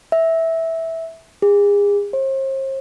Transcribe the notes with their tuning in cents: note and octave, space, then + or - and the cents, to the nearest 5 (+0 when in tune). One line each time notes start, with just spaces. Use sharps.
E5 -10
G#4 -35
C5 +40